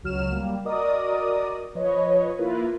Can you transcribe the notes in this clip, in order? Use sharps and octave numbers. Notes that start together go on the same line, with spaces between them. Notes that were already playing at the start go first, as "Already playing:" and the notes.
C#2 F#3 F6 E7
G3 A#3
F#4 A#4 D5 D#5 D#6
F3 B4 C#5 D#5
A#3 E4 F4 A#4 B4